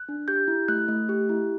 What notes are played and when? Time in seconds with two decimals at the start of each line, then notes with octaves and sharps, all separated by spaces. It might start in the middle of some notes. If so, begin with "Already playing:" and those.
Already playing: F#6
0.09 D4
0.28 G4 G6
0.48 E4
0.68 A3 F#6
0.88 A3
1.09 G4
1.29 E4